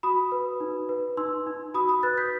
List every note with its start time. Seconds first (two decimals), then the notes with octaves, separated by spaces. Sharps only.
0.03 F#4 B5 D#6
0.32 B4
0.60 D#4
0.89 B4
1.17 D#4 C6 E6
1.47 D#4
1.74 F#4 B5 D#6
1.89 B5 D#6
2.03 B4 F#6 A6
2.17 G6 B6